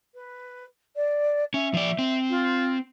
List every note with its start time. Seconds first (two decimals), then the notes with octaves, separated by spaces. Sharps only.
0.15 B4
0.96 D5
1.54 C#4 E5
1.74 F3 D5
1.99 C4
2.30 F4